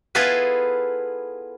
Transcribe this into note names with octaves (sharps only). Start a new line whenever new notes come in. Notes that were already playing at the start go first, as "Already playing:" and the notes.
B3 E4 F4 G#4 A4 B4